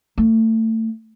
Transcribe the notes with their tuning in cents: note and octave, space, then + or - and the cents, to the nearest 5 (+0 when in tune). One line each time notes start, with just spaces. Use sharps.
A3 +25